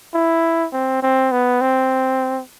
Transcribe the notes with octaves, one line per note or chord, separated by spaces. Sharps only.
E4
C4
C4
B3
C4